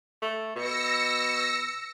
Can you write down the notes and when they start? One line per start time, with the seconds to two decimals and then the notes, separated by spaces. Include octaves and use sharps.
0.22 A3
0.56 B2 E6 A#6 C#7